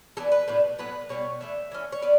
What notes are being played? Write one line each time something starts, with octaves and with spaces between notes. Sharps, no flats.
E3 B3 D4 A4
B4
A2 F#3 B3 D4
A2 F#3 B3 B4
B2 G3 B3 C#5
E3 A3 D4 E5
E3 A3 C#4
C#5
B3 D5